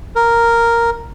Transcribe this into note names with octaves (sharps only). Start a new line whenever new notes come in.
A#4